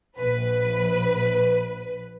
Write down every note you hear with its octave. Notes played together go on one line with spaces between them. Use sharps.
A#1 B4